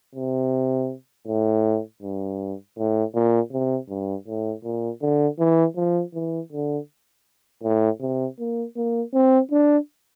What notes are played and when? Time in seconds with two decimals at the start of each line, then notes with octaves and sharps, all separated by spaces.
0.15 C3
1.27 A2
2.02 G2
2.78 A2
3.14 A#2
3.52 C3
3.89 G2
4.28 A2
4.64 A#2
5.02 D3
5.39 E3
5.76 F3
6.14 E3
6.52 D3
7.64 A2
8.01 C3
8.39 A#3
8.76 A#3
9.13 C4
9.52 D4